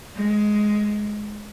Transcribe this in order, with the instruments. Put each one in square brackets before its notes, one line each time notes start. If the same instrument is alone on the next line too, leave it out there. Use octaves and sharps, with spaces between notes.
[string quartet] G#3